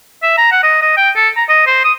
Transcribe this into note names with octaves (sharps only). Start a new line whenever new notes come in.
E5
A#5
F#5
D#5
D#5
G5
A4
A#5
D#5
C5
D#6